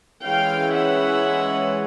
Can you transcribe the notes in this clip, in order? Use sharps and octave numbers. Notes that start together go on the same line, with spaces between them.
E3 G#3 C#4 F5 G5
E5 F#5